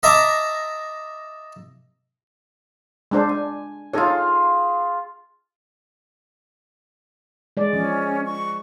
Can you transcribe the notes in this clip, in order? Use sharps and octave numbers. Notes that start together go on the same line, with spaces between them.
D#5 E5 A5 A#5 D6
G#3 D4 C5
G#5
D#4 F4 G#4 A4 C#5
G#3 D5
F3 C#4
C#6